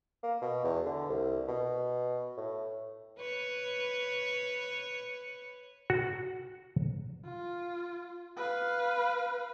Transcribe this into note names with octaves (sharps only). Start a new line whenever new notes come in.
A#3
B2
E2
D3
C2
B2
A2
B4 C#5
F#4
F4
B4 F5